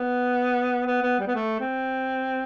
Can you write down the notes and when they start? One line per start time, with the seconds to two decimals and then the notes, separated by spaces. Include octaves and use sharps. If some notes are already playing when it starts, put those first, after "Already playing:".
Already playing: B3
0.86 B3
1.02 B3
1.19 G3
1.27 B3
1.35 A3
1.60 C4